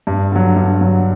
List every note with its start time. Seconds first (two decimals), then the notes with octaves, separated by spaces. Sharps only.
0.07 G2
0.32 D3 F#3
0.56 G2
0.81 D3 F#3